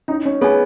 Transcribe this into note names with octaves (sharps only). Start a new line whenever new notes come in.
C#4 D#4
C#4
B3 G#4 C#5 G#5